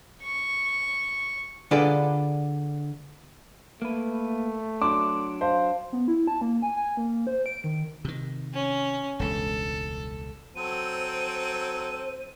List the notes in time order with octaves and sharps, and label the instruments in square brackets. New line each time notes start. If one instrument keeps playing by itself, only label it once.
[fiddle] C#6
[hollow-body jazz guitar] D3 D4 F4 G#4 A4 B4
[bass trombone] A3 [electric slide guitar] A#3 B4
[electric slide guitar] F#3 D4 [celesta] C6 [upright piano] D6
[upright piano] C5 [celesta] F5 A5
[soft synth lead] B3
E4
A5
A#3
G#5
G#5
A#3
C5
D7
D#3
[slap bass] C3 D#3
[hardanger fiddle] C#4
[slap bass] E1 C#2 G2 [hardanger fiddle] A4
[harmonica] F#3 C4 A4 [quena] C5 [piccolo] D#7